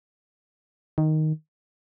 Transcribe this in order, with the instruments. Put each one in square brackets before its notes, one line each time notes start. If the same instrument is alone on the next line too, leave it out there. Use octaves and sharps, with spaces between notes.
[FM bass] D#3